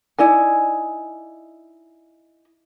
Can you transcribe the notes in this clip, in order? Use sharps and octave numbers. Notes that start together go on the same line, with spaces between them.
D#4 E4 D5 G#5